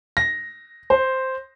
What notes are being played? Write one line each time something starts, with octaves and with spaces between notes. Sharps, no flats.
A#6
C5